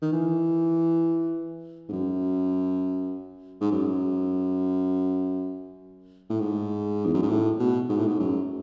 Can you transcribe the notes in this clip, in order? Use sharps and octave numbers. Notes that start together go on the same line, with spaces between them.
D#3
E3
G#2
F#2
G#2
F#2
A2
G#2
E2
F#2
G#2
A2
B2
G#2
A2
G#2
F#2